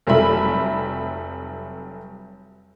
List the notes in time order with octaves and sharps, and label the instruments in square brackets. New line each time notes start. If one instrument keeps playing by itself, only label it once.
[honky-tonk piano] F1 F#3 G3 A3 E5 B5